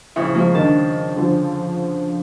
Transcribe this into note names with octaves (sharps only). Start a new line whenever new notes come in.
F2 A#2 C#3 E4
F3 G#3 A#3
D#3 D4 A5
D3 F3